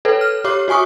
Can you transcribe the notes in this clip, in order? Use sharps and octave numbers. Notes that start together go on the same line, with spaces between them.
A4 B4 C#5
F6
G4 C#5 D6
F#4 C#5 G#5 C#6 D#6